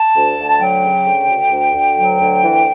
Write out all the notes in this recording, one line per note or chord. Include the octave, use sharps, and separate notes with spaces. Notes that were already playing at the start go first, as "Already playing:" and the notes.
Already playing: A5
D2
D2
A5
F#3 G5
C#3
D2
D2
D2
D2
F#3
D2
E3